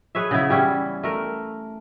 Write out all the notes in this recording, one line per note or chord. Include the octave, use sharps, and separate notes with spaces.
G#4 B4 C#5 E5
C#3 B3 E4
E3 G3 C#4 E4
A3 A#4